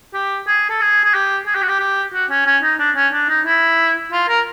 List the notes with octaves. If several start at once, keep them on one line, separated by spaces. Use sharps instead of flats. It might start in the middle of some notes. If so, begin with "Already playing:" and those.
G4
G#4
A4
G#4
G#4
G4
G#4
G4
F#4
G4
G4
F#4
C#4
C#4
D#4
D4
C#4
D4
D#4
E4
F4
A#4